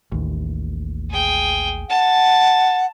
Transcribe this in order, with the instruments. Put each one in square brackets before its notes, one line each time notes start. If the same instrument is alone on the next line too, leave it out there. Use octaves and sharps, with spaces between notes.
[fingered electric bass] A1 D#2
[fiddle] G#4 G5
[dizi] F#5 [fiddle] A5